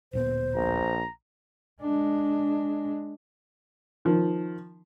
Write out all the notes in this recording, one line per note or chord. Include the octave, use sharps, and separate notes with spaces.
D1 A#2 B3 C5
A#1 A#5
G#3 D4
D#3 F3